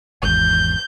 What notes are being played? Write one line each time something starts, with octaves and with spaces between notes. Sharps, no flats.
G#1 E2 G6